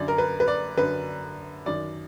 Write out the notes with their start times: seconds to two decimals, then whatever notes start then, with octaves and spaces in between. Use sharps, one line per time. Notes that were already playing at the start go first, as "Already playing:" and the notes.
Already playing: F#2 D3 D5
0.08 A#4
0.18 B4
0.40 B4
0.48 D5
0.77 F#2 D3 B4
1.66 F#2 D#3 D5